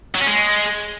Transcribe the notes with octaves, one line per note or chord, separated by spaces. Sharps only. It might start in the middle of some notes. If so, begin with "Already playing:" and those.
F#3
C#4
G#3